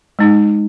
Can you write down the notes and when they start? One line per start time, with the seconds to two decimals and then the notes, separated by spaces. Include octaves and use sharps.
0.19 G#3 D#4